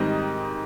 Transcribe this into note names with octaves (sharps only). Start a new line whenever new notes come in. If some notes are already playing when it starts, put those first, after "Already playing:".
Already playing: G#2 D#3 G3 C4 D#5